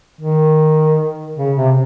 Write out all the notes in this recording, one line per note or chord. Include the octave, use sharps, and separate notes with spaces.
D#3
C#3
C3